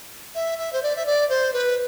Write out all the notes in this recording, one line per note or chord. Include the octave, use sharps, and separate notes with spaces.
E5
E5
C5
D5
E5
D5
C5
B4